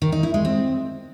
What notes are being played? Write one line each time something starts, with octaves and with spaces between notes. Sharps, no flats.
D#3
D#4
E4
G#3
C4